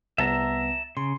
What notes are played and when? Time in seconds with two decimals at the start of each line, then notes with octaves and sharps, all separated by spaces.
0.18 C2 B3 E5 A5 A#5
0.97 C#3 C6